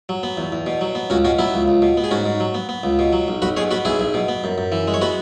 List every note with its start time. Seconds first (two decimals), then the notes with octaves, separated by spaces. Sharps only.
0.09 F#3
0.23 B3
0.37 E2
0.52 E2
0.66 B2
0.81 F#3
0.95 B3
1.10 C#2 C#4 F#4
1.25 B2 C#4 F#4
1.39 F#3 B3 E4
1.54 C#2
1.68 C#2
1.82 B2
1.97 B3
2.04 G#4
2.11 G#2 C#4 F#4
2.25 G#2
2.40 F#3
2.54 B3
2.69 B3
2.83 C#2
2.99 B2
3.12 F#3
3.28 B1
3.42 B1 F#4 B4
3.57 B2 G#4 C#5
3.71 B3 F#4 B4
3.85 B1 E4 G#4
4.00 B1
4.14 B2
4.28 B3
4.44 F#2
4.58 F#2
4.72 E3
4.88 G#3
4.94 C#5
5.01 B3 F#4 B4